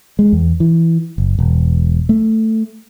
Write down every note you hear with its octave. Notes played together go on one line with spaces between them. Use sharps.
G#3
E2
E3
F#1
E1
A3